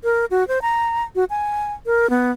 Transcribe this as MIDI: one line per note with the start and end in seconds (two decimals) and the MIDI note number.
0.04 0.25 70
0.31 0.47 66
0.48 0.62 72
0.62 1.03 82
1.15 1.24 66
1.30 1.73 80
1.86 2.09 70
2.10 2.31 59